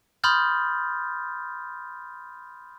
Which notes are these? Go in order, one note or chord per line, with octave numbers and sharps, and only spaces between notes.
B5 C6 D#6 F6 G6 A6